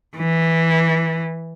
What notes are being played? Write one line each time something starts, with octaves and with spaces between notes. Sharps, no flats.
E3